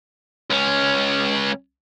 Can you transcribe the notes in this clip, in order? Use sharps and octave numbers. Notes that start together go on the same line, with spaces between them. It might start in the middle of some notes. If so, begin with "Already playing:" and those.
C#2 C#4